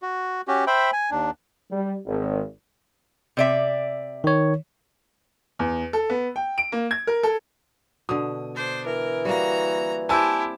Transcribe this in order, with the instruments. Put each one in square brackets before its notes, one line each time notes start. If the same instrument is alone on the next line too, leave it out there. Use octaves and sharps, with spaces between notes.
[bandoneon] F#4
C#4 F#4 G4
C5 E5 G5 B5
G#5
D#2 D4
[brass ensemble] G3
G#1
[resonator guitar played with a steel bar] C3 D5 E5
[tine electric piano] D#3 C#5
[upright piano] E2
A4
B3
G5
D7
A#3
G#6
A#4
A4
[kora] B2 D3 [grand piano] D#6
[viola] D4 C5
[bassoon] E3 [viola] A#4
[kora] G3 A#3 [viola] F#4 A#5
[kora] C4 [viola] E4 G4 [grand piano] G#5 A5 E6